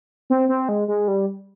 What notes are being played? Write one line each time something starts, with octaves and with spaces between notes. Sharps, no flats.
C4
C4
G#3
G#3
G3